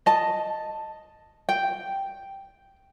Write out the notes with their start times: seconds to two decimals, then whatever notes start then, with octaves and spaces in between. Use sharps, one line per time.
0.06 D#5 A5
1.49 G5